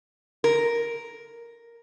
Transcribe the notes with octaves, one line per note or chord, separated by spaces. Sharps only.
A#4